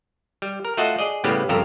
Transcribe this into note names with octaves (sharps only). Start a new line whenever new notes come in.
G3
A#4
A3 F4 F#4 D#5 F#5 A5
G#4 D5 D#5
A2 C#3 G3 B3 G4
G1 F2 C#3 G4 A4 A#4